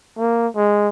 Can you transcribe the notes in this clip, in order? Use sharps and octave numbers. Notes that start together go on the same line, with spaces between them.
A#3
G#3